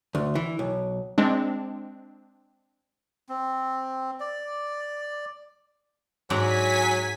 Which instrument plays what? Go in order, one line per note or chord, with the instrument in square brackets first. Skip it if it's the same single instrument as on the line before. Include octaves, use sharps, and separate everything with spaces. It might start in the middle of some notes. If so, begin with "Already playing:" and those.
[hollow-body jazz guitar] D2
E3
B1
[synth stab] G#3 C4 D4
[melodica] C4
D5
[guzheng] G#2 D4 A#5 [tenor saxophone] F#3 [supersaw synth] G#5 B6